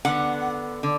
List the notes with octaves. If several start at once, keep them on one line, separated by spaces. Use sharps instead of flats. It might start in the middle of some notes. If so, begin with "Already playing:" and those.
D3 B3 F#5
D3